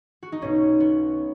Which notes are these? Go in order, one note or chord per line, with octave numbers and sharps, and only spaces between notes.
F#4
D#4
B1 B2 C#4
B3